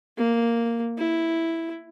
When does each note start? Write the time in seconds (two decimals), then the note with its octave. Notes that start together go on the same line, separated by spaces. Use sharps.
0.17 A#3
0.97 E4